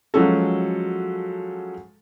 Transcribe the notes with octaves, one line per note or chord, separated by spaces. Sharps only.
F3 F#3 G#3 C#4 F#4 A4